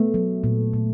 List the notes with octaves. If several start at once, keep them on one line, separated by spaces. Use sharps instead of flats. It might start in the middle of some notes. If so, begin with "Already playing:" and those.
Already playing: A3 B3
F#3
A#2
A#2